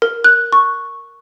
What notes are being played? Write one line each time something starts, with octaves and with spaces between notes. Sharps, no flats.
A#4
F#6
C#6